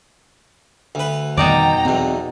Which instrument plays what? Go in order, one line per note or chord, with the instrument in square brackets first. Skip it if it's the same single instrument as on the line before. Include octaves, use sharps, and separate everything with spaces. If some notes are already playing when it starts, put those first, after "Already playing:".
[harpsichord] D2 B4
[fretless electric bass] F2 D#3 G3 [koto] B2 D#4 D5 [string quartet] G5 A#5
[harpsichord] B1 E2 [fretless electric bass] C4